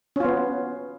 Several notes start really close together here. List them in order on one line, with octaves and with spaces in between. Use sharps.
C#4 F4 B3